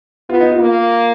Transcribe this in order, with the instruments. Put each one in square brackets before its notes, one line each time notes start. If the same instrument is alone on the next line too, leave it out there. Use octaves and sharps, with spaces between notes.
[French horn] B3 [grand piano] F4
[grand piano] D#4
F4
[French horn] A#3